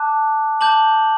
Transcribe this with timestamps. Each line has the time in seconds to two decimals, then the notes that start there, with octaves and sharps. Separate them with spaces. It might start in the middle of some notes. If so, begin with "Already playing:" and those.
Already playing: A5 D6 F#6
0.61 A5 D6 G6 F#7